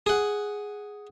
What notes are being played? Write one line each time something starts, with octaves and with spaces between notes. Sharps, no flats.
G#4 F#5